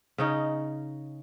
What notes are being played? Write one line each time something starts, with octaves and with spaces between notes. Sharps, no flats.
C#3 C#4 D#4